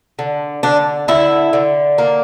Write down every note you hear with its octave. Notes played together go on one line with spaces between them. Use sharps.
D3
D3 D4
D3 E4
D3
A#3